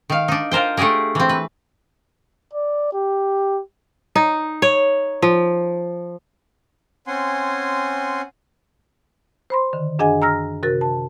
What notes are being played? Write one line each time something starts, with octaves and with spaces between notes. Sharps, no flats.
D#3 F5
D4 D#4
F4 A#4 C5 G5
A3 D4 G4 G#4 A#4
E3 C4
B4
D5
G4
D#4
C#5
F3
C4 C#4 F#5 G#5 C6
C5 B5 C6
D3 D#3
F#2 D4 G#4 D#5 F#5 G#5
A#5 E6 F6 A#6
C3 F#4 A#4 A6
A5